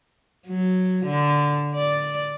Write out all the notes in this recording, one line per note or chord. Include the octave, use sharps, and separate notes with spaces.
F#3
D3
D5